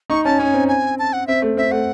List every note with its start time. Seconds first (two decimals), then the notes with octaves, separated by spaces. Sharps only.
0.10 D#4 C#6
0.25 C#4 A5
0.39 C#4 G#5
0.54 C4
0.68 G#5
0.99 A5
1.13 F#5
1.27 C4 E5
1.42 A3
1.57 C4 E5
1.71 A3 F#5